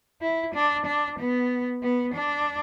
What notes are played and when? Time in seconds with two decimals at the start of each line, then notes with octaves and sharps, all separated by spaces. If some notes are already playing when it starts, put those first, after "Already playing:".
0.21 E4
0.54 D4
0.86 D4
1.19 B3
1.83 B3
2.14 D4